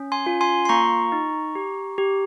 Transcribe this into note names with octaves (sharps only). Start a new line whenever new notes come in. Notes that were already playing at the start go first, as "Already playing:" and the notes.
Already playing: C#4
G#5 C6
F4
G#5 C6
C6
A#3 A#5 C#6
D#4
G4
G4